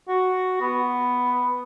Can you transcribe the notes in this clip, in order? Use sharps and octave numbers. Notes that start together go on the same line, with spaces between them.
F#4
B3